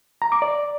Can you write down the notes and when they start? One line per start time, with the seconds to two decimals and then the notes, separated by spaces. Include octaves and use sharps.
0.22 A#5
0.32 D6
0.42 D5